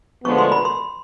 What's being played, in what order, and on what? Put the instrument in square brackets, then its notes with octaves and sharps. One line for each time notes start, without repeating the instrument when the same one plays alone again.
[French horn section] D2 D3 F3 G#3 B3 [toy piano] C#6
[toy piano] C6
B5
C6